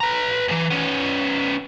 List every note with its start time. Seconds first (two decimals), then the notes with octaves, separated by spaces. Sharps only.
0.01 B4 A#5
0.48 D#2 E3
0.71 B3 C#4